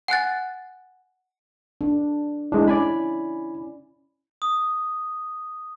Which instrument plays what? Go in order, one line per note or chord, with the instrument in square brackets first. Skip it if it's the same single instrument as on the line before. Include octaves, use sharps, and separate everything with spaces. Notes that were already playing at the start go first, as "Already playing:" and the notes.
[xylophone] F#5 G#5 F#6 A6
[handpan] D4
[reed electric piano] G#3 D4 [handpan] E4
[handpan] C#4 [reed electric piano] D5 G#5 B5
[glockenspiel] D#6